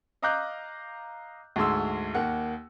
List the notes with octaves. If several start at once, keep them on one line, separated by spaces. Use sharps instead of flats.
D#5 F5 A#5 D6 F#6 G6
D2 G#2 G#4 C6 E6
D#2 A#3 F#5